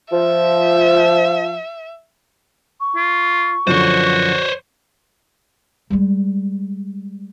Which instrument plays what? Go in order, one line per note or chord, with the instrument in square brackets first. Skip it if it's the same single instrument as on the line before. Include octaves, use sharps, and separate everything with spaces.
[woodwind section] F3 [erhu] E5
[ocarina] C#6
[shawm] F4
[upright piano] F#2 D3 F3 [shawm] F#4 [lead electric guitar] C5 C#5
[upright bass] G3 G#3